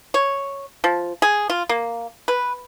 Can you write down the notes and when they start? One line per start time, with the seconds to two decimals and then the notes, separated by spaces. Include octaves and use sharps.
0.14 C#5
0.84 F3
1.22 G#4
1.50 F4
1.69 A#3
2.28 B4